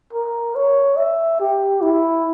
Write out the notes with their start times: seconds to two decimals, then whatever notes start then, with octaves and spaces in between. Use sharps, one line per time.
0.13 A#4
0.55 C#5
0.97 E5
1.40 G4
1.82 E4